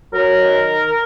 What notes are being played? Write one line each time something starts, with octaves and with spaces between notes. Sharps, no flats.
F#3 A#4
D#3